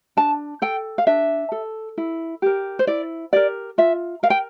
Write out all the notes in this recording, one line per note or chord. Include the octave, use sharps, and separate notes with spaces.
D4 A5
A4 G5
F5
D4 E5
A4
E4
G4 A#4
C5
E4 D5
G4 A#4 D5
F4 E5
A#4 F5
G5